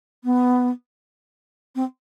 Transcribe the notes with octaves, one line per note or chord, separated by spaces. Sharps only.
B3
C4